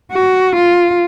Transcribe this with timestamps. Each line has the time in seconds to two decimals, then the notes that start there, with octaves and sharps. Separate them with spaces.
0.12 F#4
0.56 F4